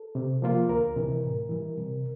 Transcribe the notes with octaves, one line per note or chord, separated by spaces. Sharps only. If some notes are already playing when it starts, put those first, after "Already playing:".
Already playing: A4
C3
F3 A#3 F4
D2 A#4
C3 E3
A2
E3 G3
C3